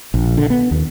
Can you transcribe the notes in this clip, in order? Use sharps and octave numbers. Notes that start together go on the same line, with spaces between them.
A#1
D3
B3
D#2